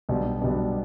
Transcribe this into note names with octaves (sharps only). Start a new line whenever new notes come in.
B1 B2 G3 B3 D4
B1 B2 G3 B3 D4